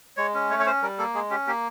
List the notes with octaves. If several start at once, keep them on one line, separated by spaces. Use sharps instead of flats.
G#3 C#5
C#4
A3 C#5
C#5
C#4 C5
G3 A#4
A#3 A4
G#3 G#4
C#4 G4
A#3 G4